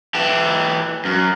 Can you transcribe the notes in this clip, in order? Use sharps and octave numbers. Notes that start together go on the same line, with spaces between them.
E3 G4
F#2